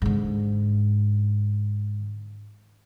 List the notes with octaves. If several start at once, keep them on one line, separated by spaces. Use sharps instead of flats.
G#2 D3